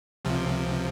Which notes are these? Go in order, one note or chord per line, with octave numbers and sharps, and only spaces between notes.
C#2 C3 F3